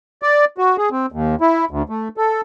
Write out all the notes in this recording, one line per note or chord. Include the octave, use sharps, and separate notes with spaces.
D5
F#4
G#4
C4
D#2
E4
D2
A3
A4